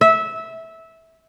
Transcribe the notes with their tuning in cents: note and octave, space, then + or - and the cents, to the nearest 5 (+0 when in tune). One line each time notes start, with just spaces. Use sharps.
E5 -15